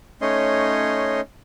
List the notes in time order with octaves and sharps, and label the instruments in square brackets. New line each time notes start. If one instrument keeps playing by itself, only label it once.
[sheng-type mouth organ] A3 C#4 D#4 C#5 D#5 C6